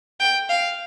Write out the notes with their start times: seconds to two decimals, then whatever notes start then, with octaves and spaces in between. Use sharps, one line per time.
0.20 G5
0.49 F5